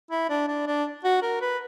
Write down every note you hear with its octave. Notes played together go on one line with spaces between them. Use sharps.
E4
D4
D4
D4
F#4
A#4
B4